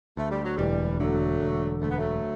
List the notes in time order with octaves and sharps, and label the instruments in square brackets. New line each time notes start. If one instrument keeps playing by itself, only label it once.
[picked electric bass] D2 [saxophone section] A3
[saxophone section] G3
F#3
[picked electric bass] E1 [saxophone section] E3 G3
[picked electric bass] D3 [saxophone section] F#3 A3
[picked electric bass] E1
[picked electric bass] D2 [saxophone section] A3
[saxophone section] B3
F#3 A3